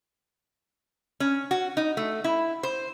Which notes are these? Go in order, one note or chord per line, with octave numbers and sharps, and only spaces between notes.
C#4
F#4
D#4
A3
E4
C5